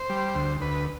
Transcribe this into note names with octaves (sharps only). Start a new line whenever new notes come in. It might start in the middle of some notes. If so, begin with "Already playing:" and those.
Already playing: C5
G3
D2
D2 B4